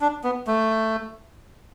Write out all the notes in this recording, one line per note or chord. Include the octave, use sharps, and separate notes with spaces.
D4
B3
A3